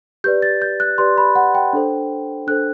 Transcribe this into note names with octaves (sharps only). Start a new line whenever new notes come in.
G4 B4 D5 G6
A6
G6
F#6
G4 B4 D5 C6
B5
F#5
G5
D4 A4 C5
D4 A4 C5 F#6